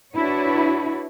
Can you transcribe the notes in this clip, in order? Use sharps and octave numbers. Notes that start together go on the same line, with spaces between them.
D4 E4 F#4 B4 C#5